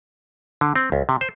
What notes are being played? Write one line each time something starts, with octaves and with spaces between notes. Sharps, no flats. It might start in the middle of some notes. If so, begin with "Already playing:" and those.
D3
C4
C#2
C3
C5